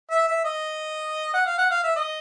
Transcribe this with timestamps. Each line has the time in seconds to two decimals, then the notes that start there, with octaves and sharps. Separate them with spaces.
0.11 E5
0.27 E5
0.44 D#5
1.34 F#5
1.46 F5
1.58 F#5
1.71 F5
1.84 E5
1.96 D#5